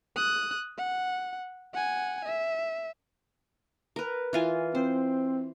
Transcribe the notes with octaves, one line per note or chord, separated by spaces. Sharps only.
D#6 F#6
F#5
F#5 G#5
E5
A#4 B4
E3 F4 G#5
C4 C5